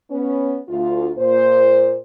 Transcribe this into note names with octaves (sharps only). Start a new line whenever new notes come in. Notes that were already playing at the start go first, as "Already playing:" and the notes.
B3 C#4
D2 F4
A#2 C5